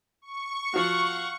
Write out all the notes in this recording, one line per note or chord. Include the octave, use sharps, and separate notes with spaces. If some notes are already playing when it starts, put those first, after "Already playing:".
C#6
F3 F#4 F5 F#5